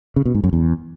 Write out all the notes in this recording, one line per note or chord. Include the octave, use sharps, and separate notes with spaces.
C#3
B2
G#2
F#2
E2